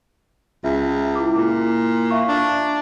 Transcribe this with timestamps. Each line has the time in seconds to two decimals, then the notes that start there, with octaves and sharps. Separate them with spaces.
0.64 C#2 E5
1.15 E4 D6
1.36 A#2
2.10 E5 F5 C#6
2.29 D4